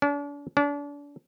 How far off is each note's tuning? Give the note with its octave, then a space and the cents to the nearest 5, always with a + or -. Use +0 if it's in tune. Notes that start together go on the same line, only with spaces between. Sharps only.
D4 -40
D4 -35